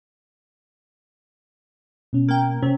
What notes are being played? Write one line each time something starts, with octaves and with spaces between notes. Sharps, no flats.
B2 C#4
A#3 G5
C3 C#4 C#5